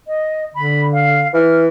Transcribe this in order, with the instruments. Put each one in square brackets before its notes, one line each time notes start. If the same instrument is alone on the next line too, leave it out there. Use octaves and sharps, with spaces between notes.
[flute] D#5
[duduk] D3 [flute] B5
[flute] F5
[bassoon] E3 [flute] F6